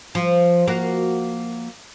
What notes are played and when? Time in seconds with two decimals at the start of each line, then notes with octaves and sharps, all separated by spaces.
0.15 F3
0.67 A#3 F#4 A#4